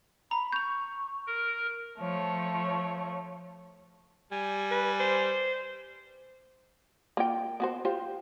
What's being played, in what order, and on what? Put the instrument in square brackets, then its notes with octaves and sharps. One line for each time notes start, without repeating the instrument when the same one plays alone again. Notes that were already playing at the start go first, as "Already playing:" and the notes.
[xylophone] A#5 [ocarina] B5
[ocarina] C#6 [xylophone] G6 F7
[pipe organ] A#4
[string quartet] F3 A3 C#5
[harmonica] G3 G#5
[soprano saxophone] B4
C5
[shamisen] A#3 F4 G5
B3 F#4 C5
F4 G4 C5